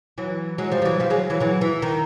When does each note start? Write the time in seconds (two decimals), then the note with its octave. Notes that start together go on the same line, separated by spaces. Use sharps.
0.18 E3 F#3
0.58 F#3 G#3
0.71 F3 G3
0.82 G3
0.85 E3 F#3
1.00 F3 G3
1.10 F#3 G#3
1.30 E3 F#3
1.40 E3 F#3
1.61 E3
1.82 D#3